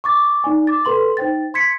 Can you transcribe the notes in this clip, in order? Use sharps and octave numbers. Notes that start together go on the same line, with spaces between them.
C#6 D6 A6
D#4 D5 G#5
D6 A6
A4 B4 C6 F#7
D#4 C5 G5 A6
C6 G#6 B6 C#7